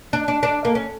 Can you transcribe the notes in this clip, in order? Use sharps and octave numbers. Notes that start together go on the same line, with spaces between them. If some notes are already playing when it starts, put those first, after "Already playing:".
D4
D4
D4
A#3
C#4